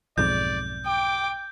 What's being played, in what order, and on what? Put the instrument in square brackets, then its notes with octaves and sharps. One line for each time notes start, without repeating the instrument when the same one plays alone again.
[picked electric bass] B1 F2 G#2 [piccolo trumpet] D5 [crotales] G6
[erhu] G5 [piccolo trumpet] D6